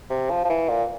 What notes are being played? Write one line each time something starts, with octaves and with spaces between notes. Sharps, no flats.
C3
F3
F3
E3
A#2